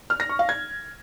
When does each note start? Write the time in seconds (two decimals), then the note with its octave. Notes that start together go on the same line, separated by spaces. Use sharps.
0.10 F6
0.20 A#6
0.29 C#6
0.39 F5
0.49 G#6